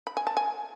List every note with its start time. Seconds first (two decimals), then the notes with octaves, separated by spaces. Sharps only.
0.07 B5
0.17 G#5
0.27 A5
0.37 G#5